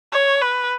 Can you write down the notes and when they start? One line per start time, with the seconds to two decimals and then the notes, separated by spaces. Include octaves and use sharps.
0.13 C#5
0.42 B4